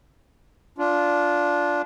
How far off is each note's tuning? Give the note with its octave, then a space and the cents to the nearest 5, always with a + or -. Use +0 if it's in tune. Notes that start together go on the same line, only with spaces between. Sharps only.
D4 -10 F4 +0